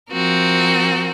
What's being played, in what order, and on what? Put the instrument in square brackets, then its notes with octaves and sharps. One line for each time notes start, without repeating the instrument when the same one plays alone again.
[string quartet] F3 C4 F#4 A#4